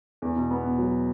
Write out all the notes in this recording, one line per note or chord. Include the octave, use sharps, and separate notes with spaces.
E2
B2
B3
B2
F#3